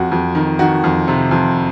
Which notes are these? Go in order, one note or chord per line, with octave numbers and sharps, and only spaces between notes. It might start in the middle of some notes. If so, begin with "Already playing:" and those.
Already playing: F2 F#4
F2
D#3
D#3 F#4
F2
C3
F2